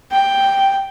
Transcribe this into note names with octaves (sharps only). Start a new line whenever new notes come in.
G5